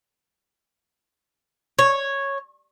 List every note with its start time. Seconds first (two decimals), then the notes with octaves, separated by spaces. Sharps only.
1.79 C#5